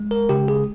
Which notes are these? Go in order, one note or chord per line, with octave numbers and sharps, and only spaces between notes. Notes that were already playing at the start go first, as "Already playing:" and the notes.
Already playing: G#3
A#4
C#3 G4
G#4